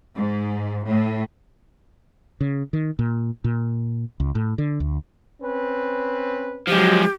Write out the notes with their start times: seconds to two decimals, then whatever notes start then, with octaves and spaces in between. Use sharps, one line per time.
0.16 G#2
0.86 A2
2.41 C#3
2.73 D#3
2.99 A#2
3.44 A#2
4.20 C#2
4.35 A2
4.58 D3
4.80 D2
5.41 C4 C#4 B4
6.68 F3 F#3 G#3 G4